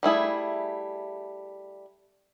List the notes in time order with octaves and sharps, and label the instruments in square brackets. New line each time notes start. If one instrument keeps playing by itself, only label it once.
[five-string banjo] G3 A3 E4 G#4